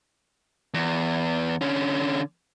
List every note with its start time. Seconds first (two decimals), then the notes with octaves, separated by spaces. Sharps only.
0.74 E2
1.61 D3 C#4